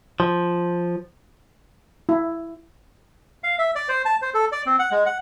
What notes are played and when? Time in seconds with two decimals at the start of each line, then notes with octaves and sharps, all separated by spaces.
0.20 F3
2.09 E4
3.44 F5
3.59 E5
3.75 D5
3.89 C5
4.05 A5
4.22 C5
4.34 A4
4.52 D5
4.66 C4
4.79 F#5
4.91 G#3
5.06 F#5